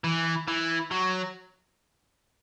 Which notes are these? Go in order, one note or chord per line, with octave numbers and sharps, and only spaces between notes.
E3
E3
F#3